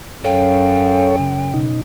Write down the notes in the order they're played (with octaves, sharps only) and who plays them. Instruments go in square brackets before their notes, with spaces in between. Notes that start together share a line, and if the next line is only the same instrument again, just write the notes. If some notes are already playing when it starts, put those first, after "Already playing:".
[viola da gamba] F#2 [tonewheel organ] A4 C#5 [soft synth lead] F5 [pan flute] G5
[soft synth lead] C#3
[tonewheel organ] B2 D#4